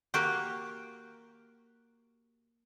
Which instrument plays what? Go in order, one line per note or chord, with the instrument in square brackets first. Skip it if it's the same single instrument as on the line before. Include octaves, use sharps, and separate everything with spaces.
[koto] A#3 F#4 G4